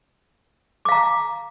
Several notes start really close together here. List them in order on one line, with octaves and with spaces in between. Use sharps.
D6 F5 A#5